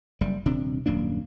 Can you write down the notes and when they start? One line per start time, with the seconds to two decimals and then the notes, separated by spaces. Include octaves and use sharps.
0.21 F#1 G3
0.46 D#1 C3 D4
0.86 D#1 F#2 A#3 D4